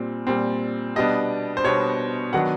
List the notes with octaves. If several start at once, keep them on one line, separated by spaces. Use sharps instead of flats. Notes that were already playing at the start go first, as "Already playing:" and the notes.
Already playing: A#2 G3 C4
A#2 G3 C4
B2 G3 B3 D4 D#5
C5
B2 G3 B3 D4 C#5
D#3 F#3 B3 D4 F#5